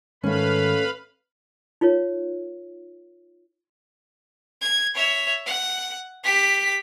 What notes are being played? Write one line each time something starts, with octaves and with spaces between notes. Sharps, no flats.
G#2 D#3 A3 C#4 B4 F5 B5
D#4 F4 A#4 C#5
G#6
C#5 E5
F#5
G4 B6